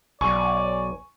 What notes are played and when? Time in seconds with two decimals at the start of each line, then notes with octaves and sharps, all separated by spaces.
0.21 B1 D5 G#5 C#6